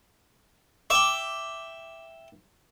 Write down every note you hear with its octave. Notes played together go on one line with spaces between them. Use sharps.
E5 G5 D6